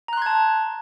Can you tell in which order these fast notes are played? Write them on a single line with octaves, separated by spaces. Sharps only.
A#5 F#6 C6 G#6 A5